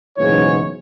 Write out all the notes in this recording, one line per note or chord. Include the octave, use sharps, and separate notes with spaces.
F#1 B1 G#2 E3 C#5